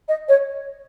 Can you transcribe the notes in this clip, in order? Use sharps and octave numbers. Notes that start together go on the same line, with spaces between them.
D#5
C#5